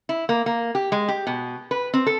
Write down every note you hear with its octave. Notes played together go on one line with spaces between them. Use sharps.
E4
A#3
A#3
G4
G#3
G4
B2
B4
C4
A4